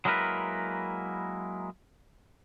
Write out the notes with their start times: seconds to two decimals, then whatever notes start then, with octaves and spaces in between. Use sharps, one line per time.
0.05 F#3 G#3 A#3 E4 A#4 B4